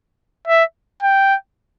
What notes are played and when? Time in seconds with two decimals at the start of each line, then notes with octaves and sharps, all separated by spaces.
0.47 E5
1.03 G5